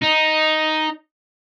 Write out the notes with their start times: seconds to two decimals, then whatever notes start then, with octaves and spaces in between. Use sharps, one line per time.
0.02 D#4